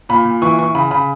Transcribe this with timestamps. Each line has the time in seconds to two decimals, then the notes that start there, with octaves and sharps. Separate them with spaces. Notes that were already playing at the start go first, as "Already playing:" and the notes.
0.09 A#2 B5
0.25 A#2
0.42 E3 C#6
0.59 E3 C#6
0.75 C#3 B5
0.91 C#3 B5